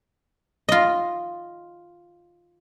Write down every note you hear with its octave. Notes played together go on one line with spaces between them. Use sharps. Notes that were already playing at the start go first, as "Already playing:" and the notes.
F4 D#5